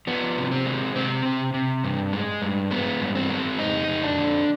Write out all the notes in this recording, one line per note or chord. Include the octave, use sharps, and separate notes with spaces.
F3 B3
C3
C4
G#3
C3 C4
C3
C3
G2
G#3
G2
G#3 B3
G2
C4
G#3
F2 D#4
F2
D4
D3